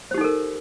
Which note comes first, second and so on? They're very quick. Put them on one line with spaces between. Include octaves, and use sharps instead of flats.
C5 G4 D#4 A4 A#4